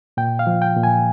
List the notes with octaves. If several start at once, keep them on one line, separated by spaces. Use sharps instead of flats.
A#2 G5
F5
F3
G5
A#2
G#5